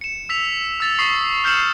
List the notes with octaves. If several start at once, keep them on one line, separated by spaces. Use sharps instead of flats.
C#7 E7
E6 B6 F7
E6 A6 F7
C#6 D#6 B6 C7
F6 G6 C7 C#7 E7 F#7